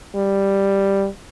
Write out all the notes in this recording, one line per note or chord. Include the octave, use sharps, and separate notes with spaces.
G3